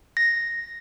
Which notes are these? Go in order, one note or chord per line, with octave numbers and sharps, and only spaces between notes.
A#6